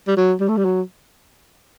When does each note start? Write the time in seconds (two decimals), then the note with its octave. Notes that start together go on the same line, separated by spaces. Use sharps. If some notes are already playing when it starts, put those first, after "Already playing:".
0.08 G3
0.17 F#3
0.41 G3
0.49 A3
0.57 G3
0.65 F#3